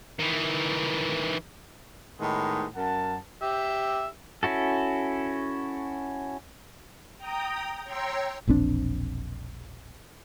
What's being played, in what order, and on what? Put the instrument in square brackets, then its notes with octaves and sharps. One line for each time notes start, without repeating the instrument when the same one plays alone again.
[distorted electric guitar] D#3 E3
[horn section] A2 D#3 G#3 B3 D#4
F#2 A#4 F#5 A5
[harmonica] G4 E5
[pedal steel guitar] C#4 E4 F#4 A4
[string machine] G5 A#5 D#6
C#5 G5 A#5 C6 E6
[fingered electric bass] E1 A#1 C4 D4